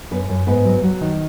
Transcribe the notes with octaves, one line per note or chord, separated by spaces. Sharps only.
F#2 B3 B4
F#2
G#2 B3 B4
F#3
F#3
D#3